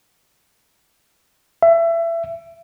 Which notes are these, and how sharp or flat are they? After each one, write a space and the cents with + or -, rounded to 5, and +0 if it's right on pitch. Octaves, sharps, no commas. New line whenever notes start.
E5 +25